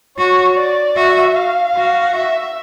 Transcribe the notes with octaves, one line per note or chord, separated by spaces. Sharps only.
F#4 C#5
D5
F#4 E5
F5
F#4
E5